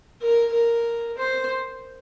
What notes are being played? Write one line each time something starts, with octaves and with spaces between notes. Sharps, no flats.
A#4
A#4
C5